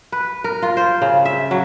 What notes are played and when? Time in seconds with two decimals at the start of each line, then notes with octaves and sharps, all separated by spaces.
0.12 B4
0.44 A#4
0.62 F4
0.77 C5
1.02 C#3
1.25 E5
1.51 F#3